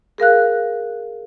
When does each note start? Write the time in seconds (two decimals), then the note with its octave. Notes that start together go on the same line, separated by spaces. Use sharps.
0.18 G#4 A#4 F5 F#6